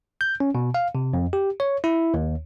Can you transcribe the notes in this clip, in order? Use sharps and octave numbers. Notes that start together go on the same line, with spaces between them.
G6
C#4
B2
F5
C3
F2
G4
C#5
E4
D#2